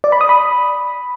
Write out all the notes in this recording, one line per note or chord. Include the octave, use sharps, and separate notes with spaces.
D5
B5
D#6
B5